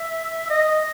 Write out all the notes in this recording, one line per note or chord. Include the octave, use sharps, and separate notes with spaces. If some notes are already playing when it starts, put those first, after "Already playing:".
Already playing: E5
D#5